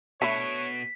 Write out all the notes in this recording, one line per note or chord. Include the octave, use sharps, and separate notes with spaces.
B2 A3 D4 E4 C#5 B6